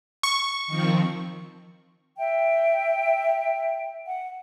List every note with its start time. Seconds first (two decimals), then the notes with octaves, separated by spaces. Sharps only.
0.23 C#6
0.67 D#3 F3 C4
2.18 E5 G5
4.07 F#5